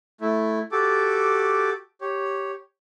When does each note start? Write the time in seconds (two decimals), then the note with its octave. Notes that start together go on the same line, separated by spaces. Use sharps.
0.21 A3 E4
0.72 F#4 G4 A4 D6
2.01 G4 C#5